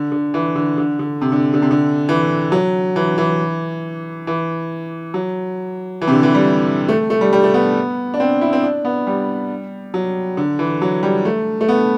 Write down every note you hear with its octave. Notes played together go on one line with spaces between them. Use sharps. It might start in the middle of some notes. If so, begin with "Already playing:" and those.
Already playing: D3
D3
E3
D3
D3
D3
C3
D3
D3
C3
D3
E3
F#3
E3
E3
E3
F#3
E3
C3
D3
E3
G3
A3
A3
G3
G3
A3
B3
D4
C4
E4
C4
D4
B3
G3
F#3
D3
E3
F#3
G3
A3
A3
B3